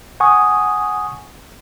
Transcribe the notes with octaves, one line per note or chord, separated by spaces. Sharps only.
F#5 G#5 C#6 D#6